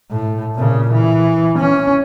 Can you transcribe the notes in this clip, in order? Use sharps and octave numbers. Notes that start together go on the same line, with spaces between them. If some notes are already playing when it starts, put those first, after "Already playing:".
A2
A#2 C#3
E3
C#4